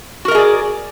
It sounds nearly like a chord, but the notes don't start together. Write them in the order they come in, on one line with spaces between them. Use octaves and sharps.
F#4 A#4 D#5 G#4 D5